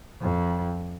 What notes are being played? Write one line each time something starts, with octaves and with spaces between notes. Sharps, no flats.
F2